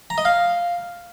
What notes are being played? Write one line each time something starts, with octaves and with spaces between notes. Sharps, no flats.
A#5
D#5
F5